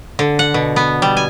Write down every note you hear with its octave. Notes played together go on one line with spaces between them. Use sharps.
D3
F#5
B2
B3
G3
G#5